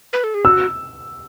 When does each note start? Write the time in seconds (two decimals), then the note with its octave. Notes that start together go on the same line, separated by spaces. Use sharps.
0.13 B4
0.24 A4
0.34 G#4
0.45 F#4 E6